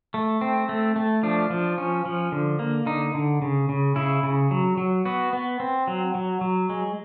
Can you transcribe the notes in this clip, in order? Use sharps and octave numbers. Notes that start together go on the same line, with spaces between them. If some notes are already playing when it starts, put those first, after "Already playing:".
A3
C4
A3
A3
F3 D4
F3
C#4
F3
D3
A#3
D3 D#4
D3
C#3
C#3
C#3 E4
C#3
F#3
F#3
B3 F#4
B3
C4
F#3
F#3
F#3
G#3